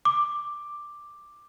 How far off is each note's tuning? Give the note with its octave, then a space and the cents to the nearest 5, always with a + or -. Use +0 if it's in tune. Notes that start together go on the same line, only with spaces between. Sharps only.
D6 +5